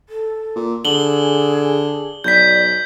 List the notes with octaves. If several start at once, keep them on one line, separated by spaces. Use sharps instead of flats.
A4
A#2
D3 G#4 F#7 G7
B1 D5 G6 B6